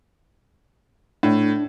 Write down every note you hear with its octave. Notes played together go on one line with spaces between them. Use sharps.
A2 D4